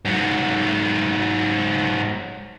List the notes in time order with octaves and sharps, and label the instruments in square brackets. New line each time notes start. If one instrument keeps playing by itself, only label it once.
[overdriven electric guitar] G#2 F#3